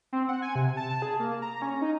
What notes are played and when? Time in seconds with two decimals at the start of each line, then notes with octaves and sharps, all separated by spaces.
0.13 C4
0.29 F#5
0.42 G#5
0.55 C3
0.77 A5
1.02 G#4
1.20 A#3
1.42 A#5
1.62 C#4
1.81 D#4